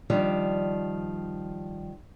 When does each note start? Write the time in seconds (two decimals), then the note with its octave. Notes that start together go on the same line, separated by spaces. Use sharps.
0.10 D#3 F3 G3 D4